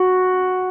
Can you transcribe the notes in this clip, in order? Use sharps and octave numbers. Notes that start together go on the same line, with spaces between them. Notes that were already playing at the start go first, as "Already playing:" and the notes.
Already playing: F#4